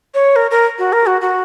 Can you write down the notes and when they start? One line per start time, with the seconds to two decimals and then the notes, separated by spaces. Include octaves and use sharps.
0.14 C#5
0.36 A#4
0.51 A#4
0.79 F#4
0.93 A#4
1.07 F#4
1.21 F#4